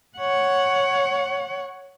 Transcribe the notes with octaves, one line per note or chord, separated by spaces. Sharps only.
C#5 F#5